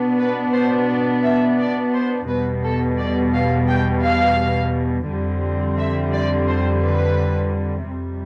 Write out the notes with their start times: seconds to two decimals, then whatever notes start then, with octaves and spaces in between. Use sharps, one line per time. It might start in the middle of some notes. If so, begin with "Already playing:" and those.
Already playing: B2 B3 D4
0.18 B4
0.54 C5
0.89 D5
1.23 E5
1.58 D5
1.93 C5
2.28 E2 B2 G3 B4
2.63 A4
2.98 D5
3.33 F5
3.68 G5
4.03 F5
5.08 F2 D3 G3 C4
5.78 E5
6.13 D5
6.48 C5
6.83 B4
7.88 F2 C3 G3